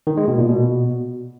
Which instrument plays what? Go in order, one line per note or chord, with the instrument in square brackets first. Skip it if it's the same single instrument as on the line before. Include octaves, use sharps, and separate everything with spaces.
[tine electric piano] D#3
G#3
B2
A#2
B2